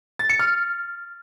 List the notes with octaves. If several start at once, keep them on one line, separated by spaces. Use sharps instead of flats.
A6
C#7
F6